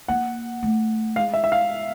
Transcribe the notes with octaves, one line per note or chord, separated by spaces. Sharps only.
A#3 F#5
A3
G#3 F5
E5
E5
F5